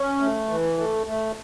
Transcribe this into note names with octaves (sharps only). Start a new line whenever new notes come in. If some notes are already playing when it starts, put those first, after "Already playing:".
Already playing: C#4
A3
E3
A3
A3